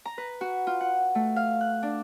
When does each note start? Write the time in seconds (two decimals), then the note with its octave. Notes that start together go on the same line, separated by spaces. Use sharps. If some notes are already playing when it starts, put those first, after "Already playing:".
0.05 A#5
0.18 B4
0.41 F#4
0.67 F4
0.81 F#5
1.15 A3
1.36 F5
1.61 F#6
1.83 D4